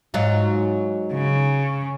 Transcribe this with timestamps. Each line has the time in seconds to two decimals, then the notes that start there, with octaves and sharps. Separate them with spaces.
0.14 G#2 F#3 F4
1.13 C#3